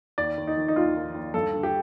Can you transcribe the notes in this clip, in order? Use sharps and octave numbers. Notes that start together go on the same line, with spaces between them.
D#2 D5
D#2
D#4
D#3
D#4
D#2 F4
D#3
D#2
G2 A4
D3
G4